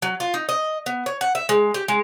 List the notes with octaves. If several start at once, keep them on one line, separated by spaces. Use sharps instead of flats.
F#3
F4
D#4
D#5
B3
C#5
F#5
E5
G#3
G4
G#3